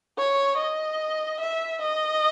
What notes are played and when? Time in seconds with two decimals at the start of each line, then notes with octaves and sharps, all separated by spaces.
0.18 C#5
0.58 D#5
1.40 E5
1.81 D#5